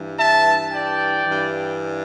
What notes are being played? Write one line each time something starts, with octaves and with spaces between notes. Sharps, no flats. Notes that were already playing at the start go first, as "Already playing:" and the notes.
Already playing: G2 E3
E5 A5
D5 G5
G2 E3